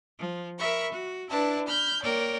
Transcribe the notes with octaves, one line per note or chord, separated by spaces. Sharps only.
F3
A#4 E5 B5 C#6
F#4
D4 E4 B4 A5
B5 F6 G6
A#3 A#4 C#5 D5 G5